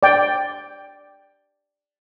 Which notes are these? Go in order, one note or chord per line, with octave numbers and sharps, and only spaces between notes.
D5 G5